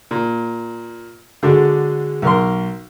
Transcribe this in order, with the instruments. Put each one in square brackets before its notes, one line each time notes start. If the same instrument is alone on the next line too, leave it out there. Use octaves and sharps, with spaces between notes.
[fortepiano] A#2
D3 G#3 D4 F#4
B1 A#4 C6